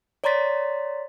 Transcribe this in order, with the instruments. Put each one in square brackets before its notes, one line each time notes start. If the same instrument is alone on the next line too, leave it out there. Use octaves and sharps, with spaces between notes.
[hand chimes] C#5 D5 A#5 C6 A6 B6